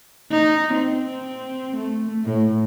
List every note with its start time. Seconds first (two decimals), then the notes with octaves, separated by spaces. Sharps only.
0.31 D#4
0.74 C4
1.76 A3
2.25 A2